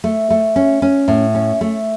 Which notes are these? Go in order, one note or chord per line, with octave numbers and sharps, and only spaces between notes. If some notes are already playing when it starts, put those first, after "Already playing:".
A3
A3
C#4
C#4
A2
C#4
A3